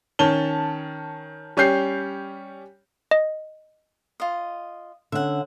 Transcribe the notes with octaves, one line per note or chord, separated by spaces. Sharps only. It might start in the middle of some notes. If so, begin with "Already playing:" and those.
D#3 C#4 A5 G7
G3 C#4 G4 G6 C7
D#5
F4 D#5
D3 C#4 E5 F#5